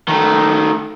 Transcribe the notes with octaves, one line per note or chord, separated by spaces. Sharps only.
D#3 A3